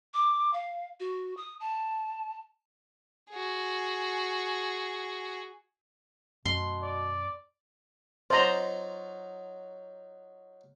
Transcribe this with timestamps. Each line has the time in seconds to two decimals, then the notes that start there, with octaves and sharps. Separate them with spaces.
0.14 D6
0.53 F5
1.00 F#4
1.37 D#6
1.60 A5
3.30 F#4 G#4
6.45 F#2 B2 C6
6.83 D5
8.30 F#3 D#4 F4 C5 D5 D#5 A#5